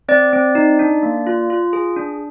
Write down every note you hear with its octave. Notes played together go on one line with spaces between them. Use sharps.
C4 D5
C4
D#4
D4
A#3
F4
F4
G#4
D4